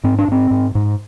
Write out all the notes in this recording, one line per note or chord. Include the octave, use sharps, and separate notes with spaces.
G#2 C4
D4
G#2 C4
G#2
G#2